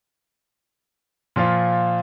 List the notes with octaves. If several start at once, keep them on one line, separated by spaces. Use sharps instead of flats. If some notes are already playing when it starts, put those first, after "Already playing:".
A#2 F3 F4